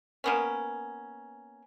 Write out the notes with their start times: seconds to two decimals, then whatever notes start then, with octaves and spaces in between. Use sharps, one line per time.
0.24 A#3 B3 C#4